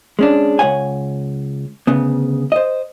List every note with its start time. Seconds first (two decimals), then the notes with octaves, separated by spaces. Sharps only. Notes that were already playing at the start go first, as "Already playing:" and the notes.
0.19 G#3 C#4 D4
0.59 C#2 G#2 C#5 F#5 G#5
1.87 D2 C#3 B3
2.52 C5 D#5